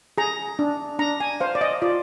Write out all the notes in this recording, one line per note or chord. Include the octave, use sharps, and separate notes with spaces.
G#4 A#5
D4
D4 A#5
G#5
C5 F5
D5
D#5
F4 D5